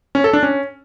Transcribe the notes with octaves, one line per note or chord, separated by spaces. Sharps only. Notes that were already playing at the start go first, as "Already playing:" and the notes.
C#4
A4
D4
C#4